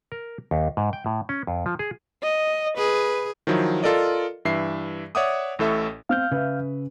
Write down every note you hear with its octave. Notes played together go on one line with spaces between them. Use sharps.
A#4
D#2
G#2
G5
A2
C#4
F2
F3
G#4
D#5
G#4 B4
D#3 F3 F#3 E4
F4 A4 A#4 D5 D#5
G2 E3 E5 C7
C#5 D5 E5 F#5 D6 D#6
A1 A2 A4 E5 C#6
C4 F5 F6 G6
C#3 B4 E5